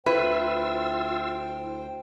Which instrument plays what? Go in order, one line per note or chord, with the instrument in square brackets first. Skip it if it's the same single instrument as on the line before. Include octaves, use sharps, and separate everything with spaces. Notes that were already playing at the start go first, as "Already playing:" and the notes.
[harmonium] D2 C5 G5 [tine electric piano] E4 [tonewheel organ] F4 E6 [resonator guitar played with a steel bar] B4